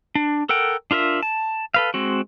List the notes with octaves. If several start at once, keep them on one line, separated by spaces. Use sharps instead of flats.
D4
A4 A#4 F#5 G5
D4 F4 A#4 E5
A5
A4 B4 F5
G#3 C4 F#4